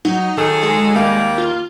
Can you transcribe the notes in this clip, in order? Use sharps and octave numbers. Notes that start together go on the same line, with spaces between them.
F#3 D#4
D#3 F#3 G#4 A4
G#3
D#2 G3 A#3 F5
F4